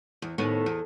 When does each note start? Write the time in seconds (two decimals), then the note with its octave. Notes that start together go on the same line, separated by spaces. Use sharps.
0.22 E2
0.38 D#2 A2 B3
0.66 E2